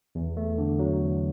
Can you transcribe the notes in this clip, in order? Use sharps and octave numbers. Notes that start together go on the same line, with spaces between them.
E2
A3
D3
F#3
E2